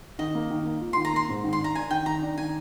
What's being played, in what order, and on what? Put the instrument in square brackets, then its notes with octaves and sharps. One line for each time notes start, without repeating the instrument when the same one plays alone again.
[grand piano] D#3 [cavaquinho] D#5
[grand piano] A#3
D#3
A#3
F4
[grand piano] D#3 [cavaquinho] C6
[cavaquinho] A#5
[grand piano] A#3 [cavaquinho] C6
[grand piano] G#2
D#3
[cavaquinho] C6
[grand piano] D4 [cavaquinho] A#5
[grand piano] D4 [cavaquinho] G#5
[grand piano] D#3 [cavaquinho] G5
[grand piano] D#3 [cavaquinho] A#5
[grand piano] D4
[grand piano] D#3 [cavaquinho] G#5